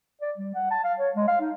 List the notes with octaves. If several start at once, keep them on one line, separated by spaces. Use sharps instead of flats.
D5
G3
F#5
A5
F5
C#5
G#3
F5
D#4